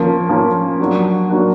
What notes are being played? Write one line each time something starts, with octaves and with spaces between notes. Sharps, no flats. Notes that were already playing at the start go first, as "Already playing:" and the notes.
Already playing: F3 A#3 C#4
F3 A#3 C#4
F#3 A#3 D4 F#4
F#3 A#3 D4 F#4